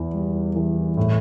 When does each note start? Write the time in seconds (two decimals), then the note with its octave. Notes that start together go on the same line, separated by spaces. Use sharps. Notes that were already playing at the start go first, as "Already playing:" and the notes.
Already playing: E2 E3
0.14 G3
0.56 E3
0.97 A2